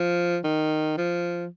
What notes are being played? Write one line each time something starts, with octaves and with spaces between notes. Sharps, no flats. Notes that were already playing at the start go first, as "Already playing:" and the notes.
Already playing: F3
D#3
F3